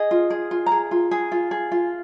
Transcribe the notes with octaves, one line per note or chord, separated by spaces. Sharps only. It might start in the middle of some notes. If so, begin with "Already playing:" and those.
Already playing: G#4 D#5
F4
G#4
F4
A#5
G#4
F4
G#4
F4
G#4
F4